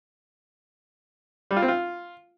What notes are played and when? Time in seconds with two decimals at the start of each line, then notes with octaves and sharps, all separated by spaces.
1.51 G3
1.56 F4
1.62 C4
1.68 F4